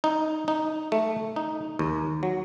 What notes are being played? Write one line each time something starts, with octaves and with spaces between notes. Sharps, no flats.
D#4
D#4
A3
D#4
D#2
F#3